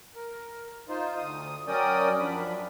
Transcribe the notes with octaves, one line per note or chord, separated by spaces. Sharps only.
A#4
D#4 F4 C5
D2 D#6
F#3 C#4 A#4 D5 G5 D#6
F#2 F3 D4 B5